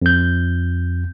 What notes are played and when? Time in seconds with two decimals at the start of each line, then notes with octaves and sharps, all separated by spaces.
0.02 F2 G6